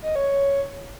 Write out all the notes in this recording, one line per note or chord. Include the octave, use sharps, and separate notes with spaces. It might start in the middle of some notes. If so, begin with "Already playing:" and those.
D#5
C#5